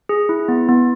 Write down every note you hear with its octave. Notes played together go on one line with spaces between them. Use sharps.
G#4
E4
B3
B3